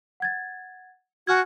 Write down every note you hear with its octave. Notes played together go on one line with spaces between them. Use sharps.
F#5 G#6 A6
F#4 G#5 F6 G#6